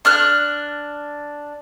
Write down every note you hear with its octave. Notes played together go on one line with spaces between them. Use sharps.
D4 F6 F#6